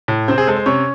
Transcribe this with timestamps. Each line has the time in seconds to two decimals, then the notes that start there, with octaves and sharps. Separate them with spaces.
0.08 A2
0.28 C3 C4 C5
0.38 G#4
0.47 G#3 A4
0.56 C5
0.66 C3 C#4 C#5